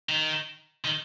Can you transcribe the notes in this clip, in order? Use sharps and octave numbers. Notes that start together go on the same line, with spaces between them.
D#3
D#3